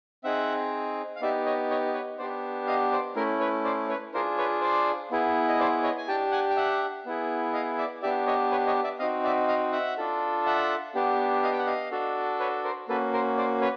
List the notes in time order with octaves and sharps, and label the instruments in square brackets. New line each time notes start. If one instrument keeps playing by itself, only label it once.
[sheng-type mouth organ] C4 D#4 G#4 E5 F#5
F5
B3 D#4 G4 D5 E5
C#5 D#5
C#5 D#5
B4 C#5
B3 D4 G4 C5 D5
D#5 F5
C5 D5
A3 C#4 E4 A#4
B4 C#5
C5 D5
B4 C#5
D4 F4 G#4 A#4 C5
B4 C#5
C5 D5
B3 E4 G#4
D#5
C5 D5
C#5 D#5
G#5
D4 G4 G5 A5
F#5 G#5
G5
E5 F#5
B3 E4 G#4
D#5 F5
D5 E5
B3 D4 G4 D5 E5
C#5 D#5
B4 C#5
C#5 D#5
D5 E5
C4 D#4 F#4 D#5 F5
D5 E5
D#5 F5
E5 F#5
D4 F4 A4
E5 F#5
B3 D4 G4
D#5 F5
G5
F#5
D#5 F5
D4 F#4 A4
B4 C#5
A#4 C5
A#3 C#4 F#4 A4 B4
A#4 C5
C5 D5
B4 C#5